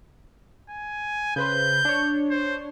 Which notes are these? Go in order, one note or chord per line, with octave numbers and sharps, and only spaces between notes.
G#5
C#3 B4 C5 G6
D4 C#5
C5